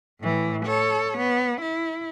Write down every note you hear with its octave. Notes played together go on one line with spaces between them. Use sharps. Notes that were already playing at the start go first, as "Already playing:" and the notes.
A2 E3
A4 C#5
B3
E4